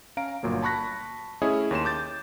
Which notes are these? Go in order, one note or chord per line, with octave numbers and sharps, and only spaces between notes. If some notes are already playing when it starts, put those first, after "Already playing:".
C#4 F5 A#5 D7
G1 A#2 F#3 A#3
A5 B5 C#6 F#6 A#6 B6
A3 C#4 E4 G#4 C#5 D#5
D#2 C#5 C6 E7
D6 G6 A6